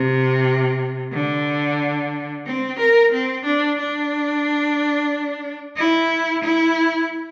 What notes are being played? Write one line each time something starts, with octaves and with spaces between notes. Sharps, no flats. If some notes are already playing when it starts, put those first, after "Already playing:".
Already playing: C3
D3
C4
A#4
C4
D4
D4
E4
E4